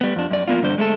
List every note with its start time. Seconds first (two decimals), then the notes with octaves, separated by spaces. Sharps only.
0.01 G3 B3
0.16 F2 D4
0.30 F#2 D5
0.48 F3 A#3 B3 F4
0.62 G2 D3 G3 C5
0.78 G#3 A3 D4 A4